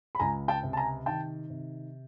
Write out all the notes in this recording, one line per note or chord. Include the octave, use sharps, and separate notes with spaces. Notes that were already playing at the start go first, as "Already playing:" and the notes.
B5
C#2 G#5 A#5
G5 A5
C3
A5
G#5 A#5
D#3 G5 A5
C3